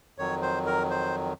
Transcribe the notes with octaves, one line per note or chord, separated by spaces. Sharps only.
F2 D#3 F#3 C#5
C5
A#4
C5